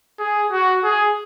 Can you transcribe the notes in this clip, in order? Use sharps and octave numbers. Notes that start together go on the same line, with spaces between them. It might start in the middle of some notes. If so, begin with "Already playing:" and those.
G#4
F#4
G#4